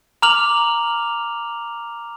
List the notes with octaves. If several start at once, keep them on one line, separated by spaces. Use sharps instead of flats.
A#5 D6 F6 F7 F#7